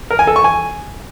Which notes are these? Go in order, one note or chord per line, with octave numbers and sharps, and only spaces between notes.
A#4
G#5
A4
C#6
G#5